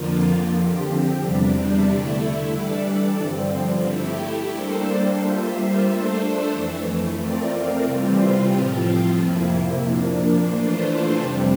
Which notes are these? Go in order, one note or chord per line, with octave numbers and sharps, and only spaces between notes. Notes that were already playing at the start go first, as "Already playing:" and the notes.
Already playing: F2 D3 F3 A#3 F4
D3 F3 C4 G4
E2 C3 G3 D4
D3 A3 E4
E3 G3 D4 A4 D5
G2 D3 F3 C4
A3 E4 G4
G3 A#3 D4 A4 C5
G3 A#3 F4 C5 E5
A3 D4 A4 C5
F2 E3 A3
A3 C4 F4 A#4 D5
C3 E3 G3 C4 F4
A2 F3 C4 F4
F2 C3 F3 A#3 E4
A#2 F3 A#3 D4
E3 A3 D4 F4 C5
F2 C3 G3 C4